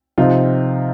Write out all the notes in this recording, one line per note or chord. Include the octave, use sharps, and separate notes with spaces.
C3 F3 C4 D#4 F4